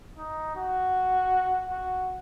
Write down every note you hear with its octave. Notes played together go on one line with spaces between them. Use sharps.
D#4
F#4
F#4